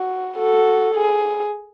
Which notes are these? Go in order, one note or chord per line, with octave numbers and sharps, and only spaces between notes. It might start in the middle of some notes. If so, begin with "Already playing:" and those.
Already playing: F#4
F#4 A4
G#4